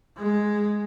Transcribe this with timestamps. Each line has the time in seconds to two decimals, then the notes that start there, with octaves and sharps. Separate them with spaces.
0.17 G#3